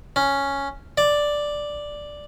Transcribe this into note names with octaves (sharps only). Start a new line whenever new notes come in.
C#4
D5